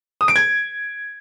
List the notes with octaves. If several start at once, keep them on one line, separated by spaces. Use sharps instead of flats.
D#6
D7
G#6